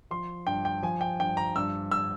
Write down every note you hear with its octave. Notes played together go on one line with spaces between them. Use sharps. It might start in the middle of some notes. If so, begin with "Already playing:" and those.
F3 C6
G2 G5
G5
F3 G#5
G5
G2 G5
A#5
G2 E6
E6